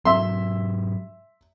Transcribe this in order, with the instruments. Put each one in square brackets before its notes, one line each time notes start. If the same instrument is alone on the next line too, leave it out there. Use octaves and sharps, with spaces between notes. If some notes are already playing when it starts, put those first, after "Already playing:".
[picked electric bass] G#2 F#3 [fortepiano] E5 C6